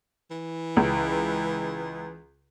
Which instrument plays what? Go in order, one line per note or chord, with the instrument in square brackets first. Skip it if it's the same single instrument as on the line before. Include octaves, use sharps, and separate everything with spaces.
[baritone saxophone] E3
[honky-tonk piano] C#2